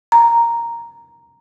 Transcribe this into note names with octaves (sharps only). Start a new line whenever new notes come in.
A#5